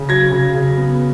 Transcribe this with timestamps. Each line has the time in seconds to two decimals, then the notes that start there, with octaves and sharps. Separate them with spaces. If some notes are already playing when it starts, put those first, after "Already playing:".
Already playing: C#3
0.09 F#3 G#6 A#6
0.31 C#3
0.55 C#3
0.78 B3